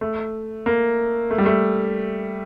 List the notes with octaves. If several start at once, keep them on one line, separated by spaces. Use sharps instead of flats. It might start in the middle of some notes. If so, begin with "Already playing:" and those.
A3
A#3
A3
G3
A3